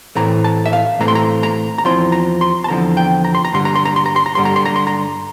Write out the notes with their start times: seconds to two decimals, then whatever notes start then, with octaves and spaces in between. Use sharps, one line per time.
0.15 A2 E3 A3 C4 A#5
0.44 A5
0.66 E5
0.73 F5
1.00 A2 E3 A3 C4 A#5
1.08 C6
1.15 A#5
1.43 A#5
1.78 A#5
1.84 E2 D3 F3 C4 E4 C6
2.12 A#5
2.41 C6
2.64 A5
2.68 E2 D3 F3 C4 E4 A#5
2.97 G5
3.25 A#5
3.35 C6
3.45 A#5
3.53 G2 D3 G3 C6
3.65 A#5
3.75 C6
3.85 A#5
3.96 C6
4.06 A#5
4.16 C6
4.26 A#5
4.35 G2 D3 G3 C6
4.45 A#5
4.56 C6
4.66 A#5
4.76 C6
4.87 A#5